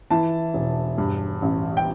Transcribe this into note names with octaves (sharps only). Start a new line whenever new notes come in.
E3 A5
E1
G2
A1
G5